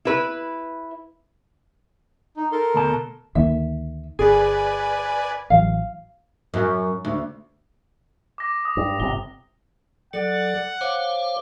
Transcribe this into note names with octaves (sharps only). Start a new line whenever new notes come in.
E4 B4
D#4
A4 A#4 C6
D2 B2 A5
D2 D#3 A#3 E5
G1 G#4 B4 D5 G#5
A1 E3 F#3 F5
F#2
D2
D6 A#6
D#6
G2
G1 C3 G7
F#3 A4 D5 F#5
C5 C#5 F5 D6